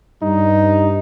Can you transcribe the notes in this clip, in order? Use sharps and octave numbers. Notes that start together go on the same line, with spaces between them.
G2 D#4